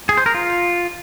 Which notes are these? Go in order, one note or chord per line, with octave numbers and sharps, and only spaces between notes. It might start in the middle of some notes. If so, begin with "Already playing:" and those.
G#4
C5
A#4
F4